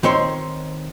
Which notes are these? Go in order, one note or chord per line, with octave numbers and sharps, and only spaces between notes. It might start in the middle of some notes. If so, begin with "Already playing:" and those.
D#3 C4 C#5 C6